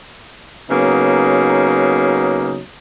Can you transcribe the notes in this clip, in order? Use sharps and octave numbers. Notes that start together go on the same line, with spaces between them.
C#3 F#3 A#3 B3 D#4